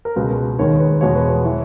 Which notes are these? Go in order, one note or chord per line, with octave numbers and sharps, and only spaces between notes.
A#4
C#2 B2 G#3 B4
D#2 D#3 G#3 C#5
B4
E2 B2 G#3 C#5
B4
C#5
E3